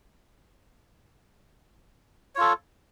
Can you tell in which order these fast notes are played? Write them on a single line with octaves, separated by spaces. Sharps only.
C#5 F4 A4